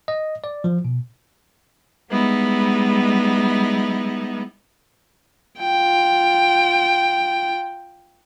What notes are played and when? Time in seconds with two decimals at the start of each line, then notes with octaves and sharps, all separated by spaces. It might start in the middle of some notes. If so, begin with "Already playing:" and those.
0.08 D#5
0.44 D5
0.64 F3
0.85 B2
2.08 G3 G#3 B3 D#4 E4
5.60 F4 G5